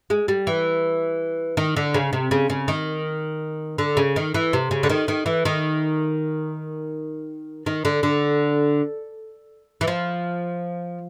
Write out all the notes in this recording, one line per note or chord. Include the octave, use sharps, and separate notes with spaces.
G#3
G3
E3
D#3
D3
C#3
C3
C#3
C#3
D#3
D3
C#3
D#3
E3
C3
C#3
D3
D#3
D#3
E3
D#3
D#3
D3
D3
E3
F3